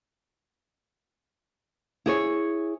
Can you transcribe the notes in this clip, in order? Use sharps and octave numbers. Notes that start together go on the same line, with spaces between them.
E4 G#4 C#5